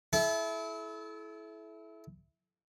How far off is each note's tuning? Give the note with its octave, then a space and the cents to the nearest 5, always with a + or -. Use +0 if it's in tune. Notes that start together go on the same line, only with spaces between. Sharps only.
E4 +0 A4 -35